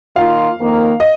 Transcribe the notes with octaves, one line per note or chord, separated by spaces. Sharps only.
D#3 A#3 F4 F5
F2 D#3 A#3
D#5